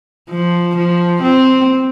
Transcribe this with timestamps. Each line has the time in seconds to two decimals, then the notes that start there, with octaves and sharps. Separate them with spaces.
0.30 F3
0.76 F3
1.22 C4